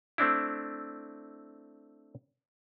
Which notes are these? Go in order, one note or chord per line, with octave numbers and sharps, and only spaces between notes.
A3 C4 D4 E4